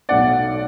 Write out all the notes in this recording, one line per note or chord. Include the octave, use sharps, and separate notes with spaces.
B1 B2 A3 D5 F#5